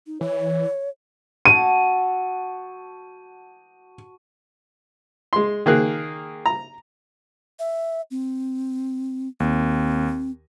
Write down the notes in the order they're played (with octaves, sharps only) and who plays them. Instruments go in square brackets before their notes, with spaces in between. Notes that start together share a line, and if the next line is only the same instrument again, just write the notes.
[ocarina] D#4
[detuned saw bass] E3 [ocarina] C#5
[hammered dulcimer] F#4 A5 [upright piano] D#7
[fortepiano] G#3 C6
D#3 A#3 G#4 F#6
A#5
[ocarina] E5
C4
[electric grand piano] D#2 [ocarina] C4